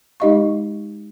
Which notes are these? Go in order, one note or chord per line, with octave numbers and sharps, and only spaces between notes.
G#3 D#4 G4 D#5 F5 C#6